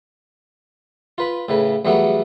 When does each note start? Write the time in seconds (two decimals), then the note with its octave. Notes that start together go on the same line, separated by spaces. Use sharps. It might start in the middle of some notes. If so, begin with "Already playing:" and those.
1.18 F4 B4 B5
1.48 A2 C#3 B4
1.85 E2 F#3 G3 A3 B3 F#5